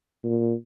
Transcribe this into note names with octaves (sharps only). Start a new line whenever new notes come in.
A#2